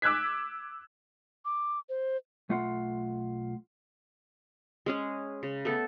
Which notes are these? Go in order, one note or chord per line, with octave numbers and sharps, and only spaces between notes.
D6 E6 F#6 G#6 B6
D6
C5
B1 A3 F4 F#5 C6
G#3 C#4 G#4
C#3
A3 B3 A4